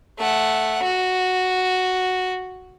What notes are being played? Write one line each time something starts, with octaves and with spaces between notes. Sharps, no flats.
A3 F#5
F#4